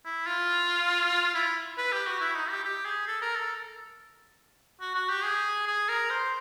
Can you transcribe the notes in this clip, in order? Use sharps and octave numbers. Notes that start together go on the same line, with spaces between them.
E4
F4
E4
B4
G4
F#4
E4
D#4
G4
G4
G#4
A4
A#4
A4
F#4
F#4
G4
G#4
G#4
A#4
C5